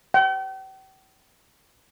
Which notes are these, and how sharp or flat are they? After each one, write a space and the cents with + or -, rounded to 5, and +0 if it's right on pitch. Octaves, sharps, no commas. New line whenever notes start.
G5 -40